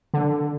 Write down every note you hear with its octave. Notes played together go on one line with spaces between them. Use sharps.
D3